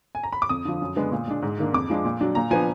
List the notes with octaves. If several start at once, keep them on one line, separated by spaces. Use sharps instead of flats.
G#5
A#5
B5
D6
F2 D#6
D3 F3
F#2
D3 G#3 B3 D4
A#2
G#3 D4
G#2
D#3 A#3 D4
F2 D6
F3 G#3 D4
A#2
F#3 D4
A#2 A#5
F3 B3 D4 G#5